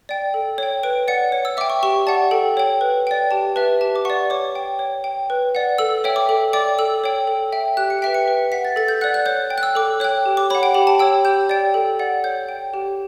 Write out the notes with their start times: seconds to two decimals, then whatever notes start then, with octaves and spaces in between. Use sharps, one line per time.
0.09 D5 G5
0.34 A4
0.58 C#5 G5
0.83 B4 D7
1.08 D5 F#5 C#7
1.32 C#5
1.45 E6
1.57 E5 D6
1.61 G5
1.70 C#6
1.83 G4 C#6
2.07 D5 F#5 A5
2.31 A4 G5
2.57 C#5 G5
2.81 B4
3.07 D5 G5
3.31 G4 A5
3.56 B4 E5 A5
3.81 G4 A5
3.96 D6
4.05 F#5 C#6
4.10 D5
4.30 C#5 D6
4.55 G5
4.79 C#5
5.04 G5
5.30 B4
5.55 D5 F#5
5.78 A4 E6
6.04 C#5 E5 G5
6.16 D6
6.29 A4
6.53 D5 G5 D6
6.79 A4 E6
7.04 C#5 G5
7.27 A4
7.52 E5 G5
7.77 G4 F#6
7.90 C#7
8.02 B4 E5 G5 B6
8.14 C#7
8.28 B4
8.52 F#5 B6
8.65 A6
8.76 A4 A6
8.88 G6
9.01 D5 F#5 F#6
9.14 F#6
9.26 C#5 G6
9.50 G5
9.58 F#6
9.63 E6
9.75 A4 D6
10.00 C#5 F#6
10.04 G5
10.26 G4
10.37 D6
10.50 C#5 B5
10.55 F#5
10.63 G5
10.74 G4 B5
10.87 A5
10.99 C#5 G5 E6
11.25 G4 G6
11.49 D5 G5
11.74 A4
11.99 D5 F#5
12.24 C#5 G6
12.49 G5
12.74 G4